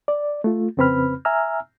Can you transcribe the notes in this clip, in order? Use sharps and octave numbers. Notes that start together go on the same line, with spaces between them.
D5
A3 F4
F2 C#3 C4 B4 B5 F6
E5 G#5 A#5 E6 F6